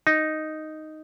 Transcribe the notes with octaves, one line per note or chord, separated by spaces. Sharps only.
D#4